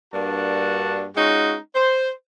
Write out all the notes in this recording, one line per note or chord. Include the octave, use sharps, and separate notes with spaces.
G2 A#3 D4 F#4 A5
G#3 C#4 D#4 F4 F#4
C5